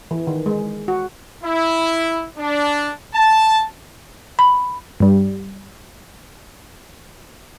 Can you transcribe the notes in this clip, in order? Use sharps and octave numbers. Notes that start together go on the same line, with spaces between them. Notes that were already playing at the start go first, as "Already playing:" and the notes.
E3
D#3
G#3
F#4
E4
D4
A5
B5
G2 G3